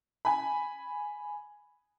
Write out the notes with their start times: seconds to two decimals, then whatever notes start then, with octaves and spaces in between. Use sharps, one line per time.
0.25 G#5 B5